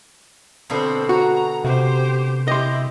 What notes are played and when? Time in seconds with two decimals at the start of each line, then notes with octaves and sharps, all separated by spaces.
0.70 B2 D3 C4 D4 B5
1.09 F#4 A#5
1.64 C3 G4 C5
2.48 E4 G4 D#5 C6